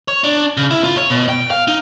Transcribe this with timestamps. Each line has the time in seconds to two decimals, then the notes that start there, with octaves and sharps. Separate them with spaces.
0.08 C#5
0.24 D4
0.57 C#3
0.71 E4
0.84 F4
0.97 C#5
1.10 B2
1.29 G5
1.51 F5
1.68 D#4